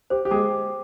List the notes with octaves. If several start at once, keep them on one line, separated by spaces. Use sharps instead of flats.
G4 C5
G4
G#3 G#4 G5 D6